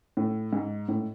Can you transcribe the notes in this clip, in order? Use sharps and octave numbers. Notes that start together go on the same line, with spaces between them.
A2
G#2
A2